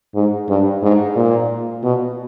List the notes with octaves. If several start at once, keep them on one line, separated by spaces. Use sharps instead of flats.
G#2
G2
G#2
A#2
B2